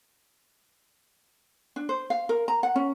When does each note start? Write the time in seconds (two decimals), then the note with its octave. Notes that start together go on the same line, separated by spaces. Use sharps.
1.76 D4
1.89 C5
2.10 F5
2.29 A#4
2.48 A#5
2.63 F#5
2.76 C#4